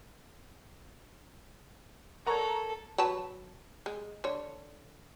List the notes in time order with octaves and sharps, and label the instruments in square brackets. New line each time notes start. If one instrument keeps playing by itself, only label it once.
[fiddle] A4 [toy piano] A#4 C#5 D5 [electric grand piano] F#5 A#5 C#6
[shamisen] F#3 B4 A5
G#3
D3 C#5